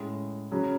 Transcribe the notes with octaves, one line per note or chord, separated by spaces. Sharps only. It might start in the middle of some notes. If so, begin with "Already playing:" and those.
Already playing: A2 G#3 C#4
C#3 F#3 C#4